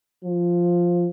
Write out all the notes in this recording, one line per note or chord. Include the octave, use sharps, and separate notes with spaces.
F3